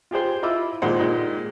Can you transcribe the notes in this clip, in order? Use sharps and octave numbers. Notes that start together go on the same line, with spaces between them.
F4 G4 G#4 C5
E4 F4 D#5 B5 D6 E6
D#2 A#2 G#3 C5 F#5
A#2 D#3 G#3